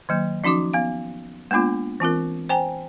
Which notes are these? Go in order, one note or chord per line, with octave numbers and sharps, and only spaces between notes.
D#3 F#3 A#3
F3 C#4 D#4 F#4 D6
B3 F5
G#3 A#3 B3 D4 F4
E3 C4 F4 A#4
C5 G5 G#5 A#5